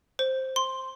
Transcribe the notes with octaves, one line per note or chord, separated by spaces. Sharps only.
C5
C6